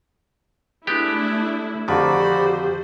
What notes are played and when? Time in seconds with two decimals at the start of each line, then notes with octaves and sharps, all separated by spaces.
0.87 G#3 A3 B3 D4 E4 G4
1.88 F2 D3 D#3 F#4 G4 C5 D5 B5